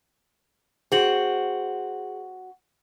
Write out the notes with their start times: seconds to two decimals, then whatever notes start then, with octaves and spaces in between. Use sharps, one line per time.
0.92 C4 F#4 G#4 F#7